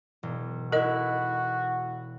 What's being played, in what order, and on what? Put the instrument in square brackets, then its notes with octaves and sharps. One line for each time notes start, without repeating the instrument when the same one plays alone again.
[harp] E1
[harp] E4 A4 [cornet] F#4 [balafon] A#4 D#5